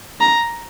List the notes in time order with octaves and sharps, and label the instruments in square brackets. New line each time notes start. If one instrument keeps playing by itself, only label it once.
[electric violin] A#5